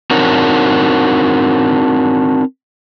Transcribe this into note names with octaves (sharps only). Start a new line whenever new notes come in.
C4 D4 D#4 F#4 A#4 C#5